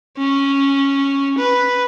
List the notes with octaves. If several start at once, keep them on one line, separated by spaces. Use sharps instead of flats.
C#4
B4